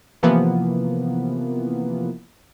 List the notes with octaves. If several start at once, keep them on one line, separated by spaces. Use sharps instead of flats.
C3 E3 F3 A#3 B3